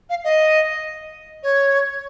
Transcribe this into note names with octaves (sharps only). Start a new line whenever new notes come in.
F5
D#5
C#5